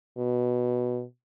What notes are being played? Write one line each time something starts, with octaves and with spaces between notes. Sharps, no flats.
B2